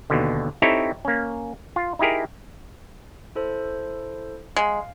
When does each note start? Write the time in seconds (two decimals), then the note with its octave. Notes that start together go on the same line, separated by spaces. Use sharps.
0.10 D#2 B2 D3
0.62 C4 D#4 E4 G4 A4 C#5
1.05 A#3 C#4
1.76 F4
1.99 D#4 E4 G4 G#4 A#4
3.35 E4 A4 C5
4.56 G#3 F5